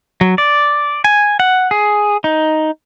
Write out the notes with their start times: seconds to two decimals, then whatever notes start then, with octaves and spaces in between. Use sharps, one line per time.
0.21 F#3
0.38 D5
1.04 G#5
1.40 F#5
1.71 G#4
2.24 D#4